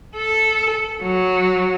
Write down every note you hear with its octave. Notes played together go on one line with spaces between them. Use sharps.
A4
F#3